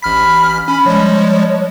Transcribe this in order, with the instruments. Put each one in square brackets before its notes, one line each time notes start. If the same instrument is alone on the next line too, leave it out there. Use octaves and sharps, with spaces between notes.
[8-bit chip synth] A1 F6 B6 [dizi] B5
[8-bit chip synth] C#4 [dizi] B5
[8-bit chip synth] F3 G3 G#3 [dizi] C#5